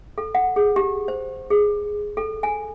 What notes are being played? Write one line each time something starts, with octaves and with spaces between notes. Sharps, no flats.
A4
F#5
G#4
G4
C5
G#4
A4
G#5